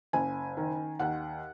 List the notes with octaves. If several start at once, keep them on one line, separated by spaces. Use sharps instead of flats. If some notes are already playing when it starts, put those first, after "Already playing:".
F#1 G#5
D#3
D#2 F#5